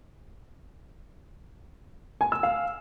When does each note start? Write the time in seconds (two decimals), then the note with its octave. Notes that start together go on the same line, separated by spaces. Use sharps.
2.21 G#5
2.32 E6
2.43 F5